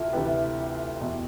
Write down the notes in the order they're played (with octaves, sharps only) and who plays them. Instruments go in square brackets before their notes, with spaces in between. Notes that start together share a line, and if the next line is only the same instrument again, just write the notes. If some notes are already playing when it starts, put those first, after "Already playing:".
Already playing: [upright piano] D2 C3 E3 E4 F4 A4
D2 C3 E3 G4 B4
E2 B2